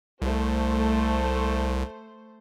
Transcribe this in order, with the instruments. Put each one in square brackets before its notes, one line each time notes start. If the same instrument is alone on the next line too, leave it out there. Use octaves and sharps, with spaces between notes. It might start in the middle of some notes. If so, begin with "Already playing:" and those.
[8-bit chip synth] C2 [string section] A3 C5